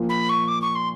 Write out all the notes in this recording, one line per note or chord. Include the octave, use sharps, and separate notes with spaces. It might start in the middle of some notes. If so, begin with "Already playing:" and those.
Already playing: A#2 F3 A#3
B5
C#6
D6
C#6
C6